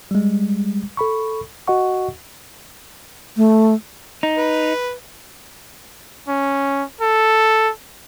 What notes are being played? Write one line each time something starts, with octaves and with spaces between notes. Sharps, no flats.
G3 G#3
A4 B5 C#6
F#4 D#5 F#5 C#6
A3
D#4
B4
C#4
A4